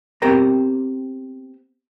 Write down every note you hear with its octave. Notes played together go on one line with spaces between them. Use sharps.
B3 C4 G4 A#4 C5 A#5